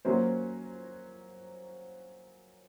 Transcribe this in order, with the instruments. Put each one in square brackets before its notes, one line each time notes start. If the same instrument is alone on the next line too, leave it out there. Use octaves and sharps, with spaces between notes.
[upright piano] F#3 A#3 C#4 F#4 C5